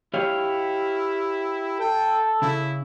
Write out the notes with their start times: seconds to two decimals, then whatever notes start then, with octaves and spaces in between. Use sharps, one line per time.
0.14 E4 G4 C#5 F5
1.80 A4 G5
2.42 C#3 E4